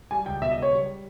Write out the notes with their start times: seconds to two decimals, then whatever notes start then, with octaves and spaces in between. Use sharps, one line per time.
0.11 G3 G#5
0.26 C#2 G5
0.41 B2 E5
0.51 D#5
0.56 C#2
0.62 C#5
0.72 G3